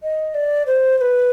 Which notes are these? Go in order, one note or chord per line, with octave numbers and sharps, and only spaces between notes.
D#5
D5
C5
C5
B4